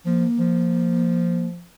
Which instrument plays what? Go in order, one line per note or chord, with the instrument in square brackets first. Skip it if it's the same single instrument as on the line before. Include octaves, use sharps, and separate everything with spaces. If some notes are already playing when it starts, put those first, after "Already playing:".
[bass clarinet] F3 [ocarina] A#3
[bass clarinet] F3